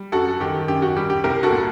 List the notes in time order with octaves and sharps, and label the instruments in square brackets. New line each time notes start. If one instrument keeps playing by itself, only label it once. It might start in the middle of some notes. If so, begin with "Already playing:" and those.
Already playing: [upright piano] G3
F#2 F#4 A4
D#3 G4
F#2 G4
F#4
G3 G4
G4
C2 G4 A#4
F#4 A4
A#2